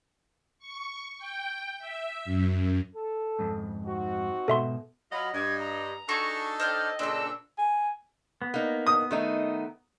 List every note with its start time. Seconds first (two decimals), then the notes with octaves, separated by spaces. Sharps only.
0.59 C#6
1.18 G5
1.79 E5
2.25 F#2
2.95 A4
3.39 F2 G#2
3.84 C4 D#4 F#4
4.48 G#2 B2 A4 E5 C6
5.12 F#3 F4 D#5 B5
5.33 G2 G#6
5.59 A#5
6.09 D4 D#4 F#4 G#4 A4 C#6
6.60 C5 D5 D#5 G5 F6
6.99 A#2 C#3 C4 D4 A4 E6
7.58 G#5
8.42 B3
8.54 A#3 D#4
8.87 D#6
9.11 D#3 A3 D#4